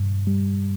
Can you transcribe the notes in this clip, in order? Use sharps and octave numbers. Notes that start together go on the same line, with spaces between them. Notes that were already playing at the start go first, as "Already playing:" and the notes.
Already playing: G2
G3